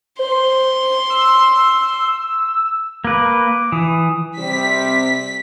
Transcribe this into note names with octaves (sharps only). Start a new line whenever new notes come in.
C5 C6
E6
A#3 B4 D6
E3 D#6
C3 G3 C4 B6